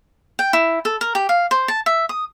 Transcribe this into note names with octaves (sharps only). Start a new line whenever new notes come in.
G5
E4
A4
A#4
G4
F5
C5
A5
E5
D#6